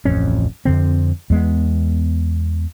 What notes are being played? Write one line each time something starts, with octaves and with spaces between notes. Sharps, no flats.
D1 A1 F2 C#4
F2 D3 C4
E2 G#3 B3